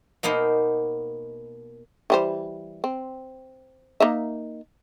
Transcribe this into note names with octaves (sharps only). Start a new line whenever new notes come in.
B2 A#3 B3 D#4 C5
E3 G3 C5
C4
A#3 D#4 E5